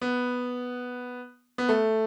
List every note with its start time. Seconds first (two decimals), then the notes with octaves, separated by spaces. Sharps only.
0.01 B3
1.58 B3
1.69 A3